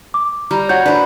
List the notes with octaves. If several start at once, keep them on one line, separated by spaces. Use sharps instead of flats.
D6
G3 A#5
F#4 C#5 F#5 G6
D4 B4 C5 D5